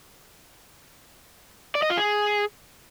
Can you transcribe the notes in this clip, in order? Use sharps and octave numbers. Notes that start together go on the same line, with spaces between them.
D5
D#5
F4
G#4